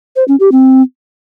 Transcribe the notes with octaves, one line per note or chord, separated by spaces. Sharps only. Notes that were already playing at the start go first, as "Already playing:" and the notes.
C5
C#4
G4
C4